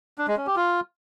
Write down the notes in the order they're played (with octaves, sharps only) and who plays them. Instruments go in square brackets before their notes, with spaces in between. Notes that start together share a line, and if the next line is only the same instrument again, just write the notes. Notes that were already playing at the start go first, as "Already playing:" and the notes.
[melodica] D4
G#3
C#4
G4
F4